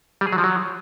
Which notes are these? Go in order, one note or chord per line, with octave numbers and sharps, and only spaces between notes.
G3
G#4
F#3
F3
F#3